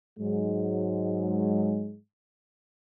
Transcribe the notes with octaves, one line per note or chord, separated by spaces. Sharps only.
G#2 F#3 G#3